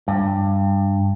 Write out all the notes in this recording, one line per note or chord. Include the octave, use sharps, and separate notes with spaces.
G2